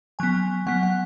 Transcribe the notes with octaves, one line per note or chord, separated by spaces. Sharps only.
F#3 B3 G#5
F#3 B3 F#5
F#5